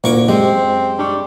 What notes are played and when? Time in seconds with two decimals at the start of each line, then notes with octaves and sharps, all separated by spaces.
0.04 D2 A#2 A#3 E4 C#6 D6
0.28 F#2 G#3 C4 G4
0.99 G3 D4 C#6